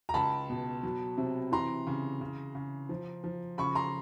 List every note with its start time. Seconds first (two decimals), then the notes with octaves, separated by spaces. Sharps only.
0.09 A#5
0.14 C#2 A5 B5
0.49 B2
0.83 F#3
1.18 C3
1.52 E3 A#5 C6
1.87 C#3
2.21 C#3
2.55 C#3
2.89 F3
3.24 F3
3.58 C#3 B5 C#6
3.75 A#5 C6